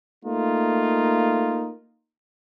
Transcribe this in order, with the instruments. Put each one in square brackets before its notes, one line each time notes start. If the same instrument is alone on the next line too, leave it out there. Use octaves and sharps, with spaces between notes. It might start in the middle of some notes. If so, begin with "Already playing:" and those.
[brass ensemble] A3 A#3 D#4 F4